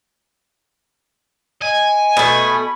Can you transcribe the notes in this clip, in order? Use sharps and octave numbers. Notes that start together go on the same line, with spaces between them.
D#5 G#5
B2 A3 B5